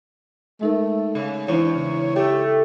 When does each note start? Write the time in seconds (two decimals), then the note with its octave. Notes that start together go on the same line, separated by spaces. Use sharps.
0.61 G#3 A3 D#4 A#4
1.15 C#3
1.48 E2 D4 E4 C5 C#5
1.75 C#3
2.16 A3 G4